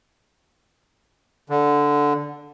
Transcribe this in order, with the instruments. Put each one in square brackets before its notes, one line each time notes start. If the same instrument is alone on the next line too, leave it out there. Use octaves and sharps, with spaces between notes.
[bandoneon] D3